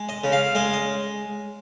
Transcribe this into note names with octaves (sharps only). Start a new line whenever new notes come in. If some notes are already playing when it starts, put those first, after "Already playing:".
Already playing: G#3
D#5
C#3
F5
G#3 D#5
D#5